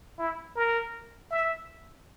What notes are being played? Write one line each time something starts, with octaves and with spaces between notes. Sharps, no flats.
E4
A#4
E5